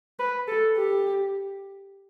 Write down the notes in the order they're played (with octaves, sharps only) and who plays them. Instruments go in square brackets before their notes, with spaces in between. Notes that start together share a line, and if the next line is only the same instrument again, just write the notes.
[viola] B4
A4
G4